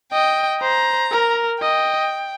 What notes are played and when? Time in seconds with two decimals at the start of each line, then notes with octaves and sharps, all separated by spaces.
0.12 D#5 G5
0.62 C5 A#5
1.12 A#4
1.62 D#5 G5